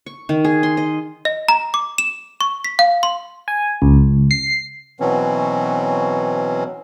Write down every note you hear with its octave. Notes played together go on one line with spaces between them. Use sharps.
C#6
D#3
G#4
C6
D#5
D#5
A#5
D6
E7
C#6
B6
F5
C6
G#5
C#2
C7
B2 E3 F#3 C4 C#4